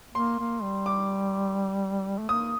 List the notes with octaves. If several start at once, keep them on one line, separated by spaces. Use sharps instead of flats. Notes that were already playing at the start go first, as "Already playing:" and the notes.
A#3 C6
A#3
G3
D6
A3
A#3 D#6